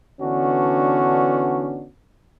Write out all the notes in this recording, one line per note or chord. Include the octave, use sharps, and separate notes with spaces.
D3 E3 B3 C#4 D4 F#4